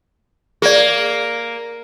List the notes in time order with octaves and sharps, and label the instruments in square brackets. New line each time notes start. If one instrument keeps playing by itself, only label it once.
[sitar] A#3 [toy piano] G#4 D5